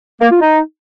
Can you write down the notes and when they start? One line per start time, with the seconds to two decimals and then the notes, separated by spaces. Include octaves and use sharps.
0.20 A#3
0.30 F4
0.40 D#4